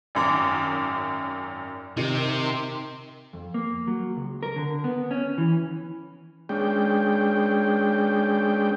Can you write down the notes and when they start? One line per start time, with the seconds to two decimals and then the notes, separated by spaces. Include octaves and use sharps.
0.15 G#1 F#2 D6
1.97 C3 D#3
3.33 F2
3.54 A#3
3.87 F#3
4.17 C#2
4.43 A#4
4.56 D3
4.84 B3
5.11 C#4
5.38 E3
6.49 G#3 C#4 D4 G5